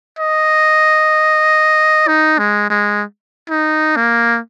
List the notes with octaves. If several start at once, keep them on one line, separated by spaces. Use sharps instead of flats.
D#5
D#4
G#3
G#3
D#4
A#3